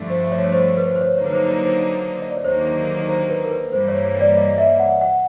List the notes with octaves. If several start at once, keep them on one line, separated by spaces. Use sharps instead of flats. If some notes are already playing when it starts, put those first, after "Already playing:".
Already playing: G2 D3 F3 A3
C5
C#5
C#5
C5
C5
B4
C5
C5
C#5
D3 F#3 A#3 D#4 C#5
B4
C5
C#5
C5
D#5
D5
C#5
D#2 D3 F#3 A#3 D#4 C5
C5
B4
A#4
B4
G2 E3 G3 A#3 C5
C#5
C#5
C#5
D5
D#5
E5
F#5
F#5